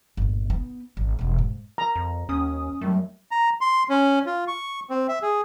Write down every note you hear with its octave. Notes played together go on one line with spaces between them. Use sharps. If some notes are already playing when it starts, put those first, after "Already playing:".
G1 A#2
B3 D#4
G#1
E1 C3
G#2
A#5
F2
D#2 C#4 D#6
F#2 D#3 F#3 G3 A3
A#5
C6
C#4
F4
C#6
C4
E5
G#4